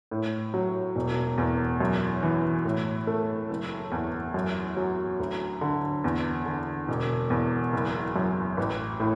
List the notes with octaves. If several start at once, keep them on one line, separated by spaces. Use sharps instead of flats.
A2
F#3
E1
E2
F#2
E3
A2
A3
F#1
E2
F#2
F#3
D2
D3
E2
D3
E1
E2
F#1
F#2
A1
A2